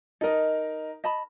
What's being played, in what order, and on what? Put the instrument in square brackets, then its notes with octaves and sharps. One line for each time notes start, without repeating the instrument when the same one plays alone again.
[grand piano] D#4 A#4 [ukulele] A4 D#5
[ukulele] D#5 A5 B5